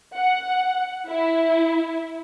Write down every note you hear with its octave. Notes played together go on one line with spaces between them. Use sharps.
F#5
E4